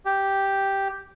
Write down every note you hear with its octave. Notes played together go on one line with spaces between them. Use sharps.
G4